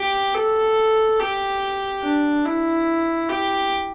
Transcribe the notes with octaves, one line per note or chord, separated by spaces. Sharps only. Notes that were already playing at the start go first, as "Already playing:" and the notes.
Already playing: G4
A4
G4
D4
E4
G4